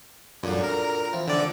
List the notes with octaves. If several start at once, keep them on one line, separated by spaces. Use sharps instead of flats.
F#2 A#2 D3 F#4
A#4
E3 F3 C4
D3 D5